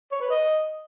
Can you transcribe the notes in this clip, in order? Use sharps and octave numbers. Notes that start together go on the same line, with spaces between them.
C#5
B4
D#5